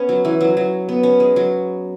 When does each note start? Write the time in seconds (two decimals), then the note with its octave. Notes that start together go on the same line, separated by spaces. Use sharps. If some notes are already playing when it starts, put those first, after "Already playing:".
Already playing: B3 C#4
0.09 F#3
0.25 E3
0.41 F#3
0.57 F#3
0.89 B3
1.03 C#4
1.20 G#3
1.36 F#3